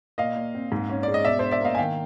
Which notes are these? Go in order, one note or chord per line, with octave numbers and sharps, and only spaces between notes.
A#2 D#5 F5
A#2
C4
G#2
C#4
G#3 D5
D#5
B2 D5 E5
D4 C5 D5
D5 E5
A#3 D#5 F5
G#5
D#3 F5 G5